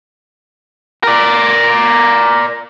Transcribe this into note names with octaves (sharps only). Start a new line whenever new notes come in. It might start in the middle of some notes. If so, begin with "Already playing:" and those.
A#4 D5